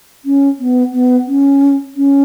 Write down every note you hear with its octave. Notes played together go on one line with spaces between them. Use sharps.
C#4
B3
B3
C#4
C#4